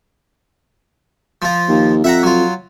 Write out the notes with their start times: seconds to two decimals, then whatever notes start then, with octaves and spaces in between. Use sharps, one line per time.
1.42 F3 F4
1.68 D#2
2.04 F2 E5 F#5 A#5
2.23 F#3 F4